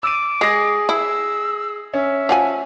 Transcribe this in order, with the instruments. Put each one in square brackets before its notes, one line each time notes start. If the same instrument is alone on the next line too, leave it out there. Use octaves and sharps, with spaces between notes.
[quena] D6 [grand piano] E6 D#7
[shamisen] G#3 [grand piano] G#4 A#6
[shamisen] E4 [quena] E6
[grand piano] C#4 [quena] E5
[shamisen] F3 F#5 G#5